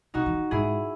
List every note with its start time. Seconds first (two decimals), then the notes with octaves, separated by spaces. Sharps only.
0.14 C#3 D#4 F#4
0.26 E3
0.51 G#2 E4 G#4